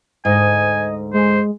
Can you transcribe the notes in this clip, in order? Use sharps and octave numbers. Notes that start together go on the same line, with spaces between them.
D2 G#2 D#5 G#5
G#3 C5